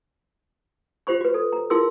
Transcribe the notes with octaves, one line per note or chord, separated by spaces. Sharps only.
F4 G4 C5 B5 C#6
F#4 B4
A4
A#5
E4 F4 G#4 A#4 C6 E6